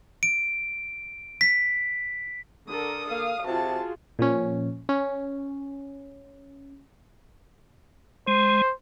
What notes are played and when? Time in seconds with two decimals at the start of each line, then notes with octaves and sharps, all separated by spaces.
0.23 D7
1.41 B6
2.69 D3 A4 A#4 D#6
3.11 A#3 F5
3.46 C3 F4 F#4 G#4 A5
4.19 A#2 F3 C#4
4.89 C#4
8.28 G#3 C5